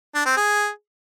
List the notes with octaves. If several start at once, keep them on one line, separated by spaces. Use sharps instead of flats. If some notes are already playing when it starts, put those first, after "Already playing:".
D4
C4
G#4